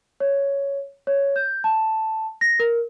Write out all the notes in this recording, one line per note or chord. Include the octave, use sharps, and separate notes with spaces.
C#5
C#5
G6
A5
A#6
A#4